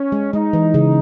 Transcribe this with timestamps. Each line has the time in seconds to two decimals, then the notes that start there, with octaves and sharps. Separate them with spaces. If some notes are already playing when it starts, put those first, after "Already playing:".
Already playing: C#4
0.12 G#3
0.33 G#3 D#4
0.53 E3
0.74 C#3